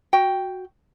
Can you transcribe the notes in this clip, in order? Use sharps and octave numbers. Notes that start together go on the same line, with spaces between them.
F#4 G5